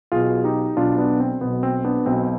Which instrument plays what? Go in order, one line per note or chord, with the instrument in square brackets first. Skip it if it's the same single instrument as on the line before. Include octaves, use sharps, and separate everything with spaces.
[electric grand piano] B1 B2 F4 G#4
D#4 G4
B1 B2 D4 F4
B3 D4
C4
B1 B2 B3
C4
B3 D4
B1 B2 C4